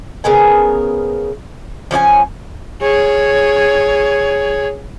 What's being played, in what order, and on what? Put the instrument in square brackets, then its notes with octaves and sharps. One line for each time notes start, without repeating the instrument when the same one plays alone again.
[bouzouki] C#3 B3 A#4 G#5
F3 C#4 D5 G#5
[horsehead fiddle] G#4 C#5